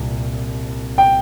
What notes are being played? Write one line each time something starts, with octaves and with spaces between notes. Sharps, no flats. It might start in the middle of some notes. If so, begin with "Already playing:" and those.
Already playing: C2 A#2
G5